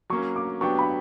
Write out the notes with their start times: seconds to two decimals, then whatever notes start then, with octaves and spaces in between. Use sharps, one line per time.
0.10 F#3 A#3 C#4 C#6
0.36 D6
0.61 F#3 B3 D4 G4 C#6
0.79 B5